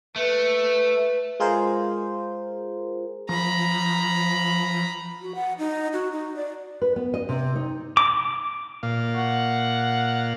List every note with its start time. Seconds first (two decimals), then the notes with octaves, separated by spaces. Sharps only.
0.16 A3 B4
1.40 G#3 F4 G#4 A#4 C5
3.29 F3 A#5 B5
5.22 F#4
5.35 F#5
5.58 D#4
5.93 F#4
6.12 D#4
6.36 D5
6.82 B4
6.96 B3
7.14 D#5
7.29 C3
7.56 D#4
7.97 D6
8.83 A#2 F5
9.17 F#5